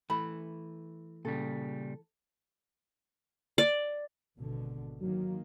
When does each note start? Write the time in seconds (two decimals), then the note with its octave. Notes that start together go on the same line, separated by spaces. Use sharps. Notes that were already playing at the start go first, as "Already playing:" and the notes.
0.10 E3 A3 B5
1.25 A#2 C#3 G3 A4
3.58 D5
4.39 G#1 B2 D3
5.01 D#3 F#3 A#3